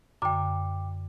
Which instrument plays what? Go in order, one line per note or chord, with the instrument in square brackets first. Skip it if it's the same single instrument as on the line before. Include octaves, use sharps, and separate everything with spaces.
[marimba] F#2 D3 [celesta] G5 D6